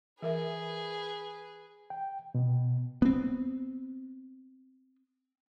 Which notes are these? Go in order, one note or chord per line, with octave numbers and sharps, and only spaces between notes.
E3 G#4 A#4 B4 E5
G5
B2
B3 C4